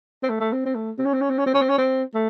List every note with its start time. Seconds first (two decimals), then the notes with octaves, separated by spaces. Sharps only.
0.23 C4
0.30 A3
0.40 A3
0.53 C4
0.66 C4
0.75 A3
0.99 C4
1.06 C#4
1.14 C4
1.21 C#4
1.30 C4
1.38 C#4
1.46 C4
1.54 C#4
1.62 C4
1.69 C#4
1.78 C4
2.14 A3